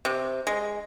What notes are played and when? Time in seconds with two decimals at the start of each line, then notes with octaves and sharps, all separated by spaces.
0.05 C3
0.47 G#3